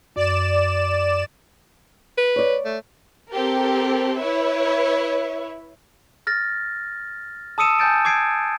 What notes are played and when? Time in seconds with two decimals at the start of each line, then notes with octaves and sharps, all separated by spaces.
0.16 F#2 D5 E7
2.18 B4
2.36 C#5 D5
2.65 A3
3.30 C4 G4 A4 A#4
4.17 E4 B4 C#5 E5
6.27 F6 A6 A#6
7.58 A5 D#6 E6 C#7 D#7 E7
7.79 G#5 A5 G6 A6 D7
8.05 D6 G#6 C7 D7